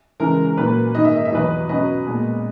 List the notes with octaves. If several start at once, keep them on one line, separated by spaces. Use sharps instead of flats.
C#3 E3 G#3 A#4
A#4
A#2 F#3 A#3 B4
G#2 D#3 A#3 D#5
E5
D#5
E5
E2 B2 F#3 B4 D#5
B2 F#3 C#4 B4 D#5
A#2 G#3 B3